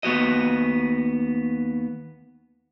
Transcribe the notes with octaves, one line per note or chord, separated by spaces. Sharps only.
D#2 A3 B3 F#4 D#5